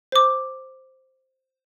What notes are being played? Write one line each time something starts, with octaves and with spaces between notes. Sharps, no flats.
C5 D6